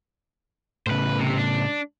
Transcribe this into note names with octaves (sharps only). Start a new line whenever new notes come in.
A2 C#3 B4 C5
C3
D4